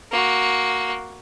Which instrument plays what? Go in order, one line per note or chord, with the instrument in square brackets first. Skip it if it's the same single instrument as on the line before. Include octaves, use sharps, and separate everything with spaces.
[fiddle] A#3 F#4